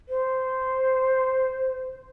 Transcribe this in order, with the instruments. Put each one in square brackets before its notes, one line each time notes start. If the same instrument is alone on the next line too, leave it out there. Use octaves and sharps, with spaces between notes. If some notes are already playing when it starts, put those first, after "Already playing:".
[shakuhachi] C5